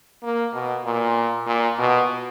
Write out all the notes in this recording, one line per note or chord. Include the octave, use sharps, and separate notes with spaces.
A#3
B2
A#2
A#2
B2